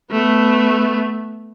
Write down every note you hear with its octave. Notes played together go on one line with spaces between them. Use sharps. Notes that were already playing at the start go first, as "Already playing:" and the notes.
A3 B3